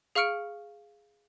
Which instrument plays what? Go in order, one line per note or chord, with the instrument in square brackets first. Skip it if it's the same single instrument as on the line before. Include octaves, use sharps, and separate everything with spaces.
[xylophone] G#4 F5 C#6 F6 C#7 D7